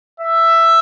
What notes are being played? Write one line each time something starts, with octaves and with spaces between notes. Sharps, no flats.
E5